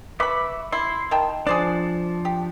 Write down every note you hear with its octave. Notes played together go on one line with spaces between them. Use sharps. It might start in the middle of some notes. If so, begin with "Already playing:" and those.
B4 E5 B5 C#6 D6
E4 C6
D#3 G5 A5
F3 D4 G#4 C5 D5
G4